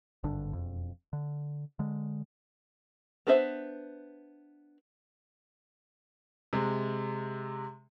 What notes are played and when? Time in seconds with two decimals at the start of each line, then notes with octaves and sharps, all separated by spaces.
0.24 G#1 G2 D3 D4
0.53 E1 F2
1.13 D3
1.79 D3 G#3
3.27 B3 D4 B4 C5 E5
6.53 C3 G#3